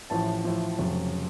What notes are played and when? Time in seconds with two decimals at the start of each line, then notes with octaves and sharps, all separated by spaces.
0.10 A1 A2 F3 A5
0.44 A1 A2 F3
0.79 F1 F2 C#3 F#3